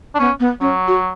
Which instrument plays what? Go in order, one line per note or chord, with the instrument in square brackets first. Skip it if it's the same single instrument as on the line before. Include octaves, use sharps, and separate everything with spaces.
[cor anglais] D4
[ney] B3 [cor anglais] C#4
[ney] B3
[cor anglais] F#3 [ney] C#4
[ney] F#4